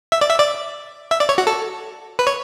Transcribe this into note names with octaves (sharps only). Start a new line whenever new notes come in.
E5
D5
E5
D5
E5
D5
C#5
F#4
A4
B4
C#5